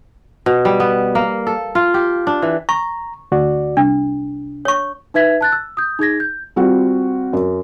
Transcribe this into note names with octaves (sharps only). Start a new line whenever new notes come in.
B2
G3
B3
A#3
A4
F4
G4
D4
E3
A#5 C#6
D2 F#4 D5
C2 D4
C#5 C#6
D#4 B4 E5 G#6 B6
A5 F#6 A6
E6
D#6 G6
D#4 G#4 G#6 A#6
G6
G3 C4 F4 F#4
F#2